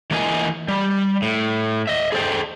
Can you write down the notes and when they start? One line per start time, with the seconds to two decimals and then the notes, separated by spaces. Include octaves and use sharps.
0.11 E3 A#3 F4 D#5 F5 G#5
0.68 G3
1.22 A2
1.87 D#5 E5
2.12 G#4 A4 C5 D5 G5